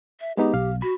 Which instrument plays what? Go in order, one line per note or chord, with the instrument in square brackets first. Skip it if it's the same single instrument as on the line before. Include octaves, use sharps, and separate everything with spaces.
[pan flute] E5
[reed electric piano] G#3 B3 D#4 [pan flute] G4
[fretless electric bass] B1 [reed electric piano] F5
[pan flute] F#4 [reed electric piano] B5